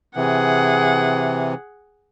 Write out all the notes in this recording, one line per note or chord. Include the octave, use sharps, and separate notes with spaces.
C3 E3 G#4 F#5